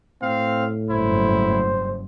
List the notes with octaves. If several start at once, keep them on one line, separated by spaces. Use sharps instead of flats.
A2 C4 F5
F#1 G2 E4 C5